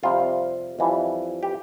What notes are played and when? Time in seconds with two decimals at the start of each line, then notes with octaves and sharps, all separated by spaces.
0.03 F2 C3 G3 C4 F4
0.79 F2 E3 G3
1.43 G4